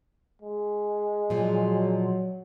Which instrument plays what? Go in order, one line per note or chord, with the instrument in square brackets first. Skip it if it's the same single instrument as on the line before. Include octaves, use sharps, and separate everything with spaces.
[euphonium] G#3
[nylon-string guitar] A#2 F3 [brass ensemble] F#3